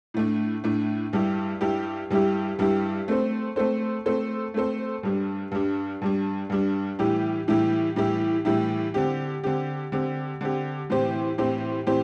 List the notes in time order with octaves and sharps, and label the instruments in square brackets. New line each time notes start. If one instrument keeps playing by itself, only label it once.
[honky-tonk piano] A2 A3 D4
A2 A3 D4
G2 G3 E4 G4
G2 G3 E4 G4
G2 G3 E4 G4
G2 G3 E4 G4
A3 C4 A4 C5
A3 C4 A4 C5
A3 C4 A4 C5
A3 C4 A4 C5
G2 G3 D4
G2 G3 D4
G2 G3 D4
G2 G3 D4
A2 E3 G3 E4 G4
A2 E3 G3 E4 G4
A2 E3 G3 E4 G4
A2 E3 G3 E4 G4
D3 C4 G4
D3 C4 G4
D3 C4 G4
D3 C4 G4
A2 E3 C4 G4 C5
A2 E3 C4 G4 C5
A2 E3 C4 G4 C5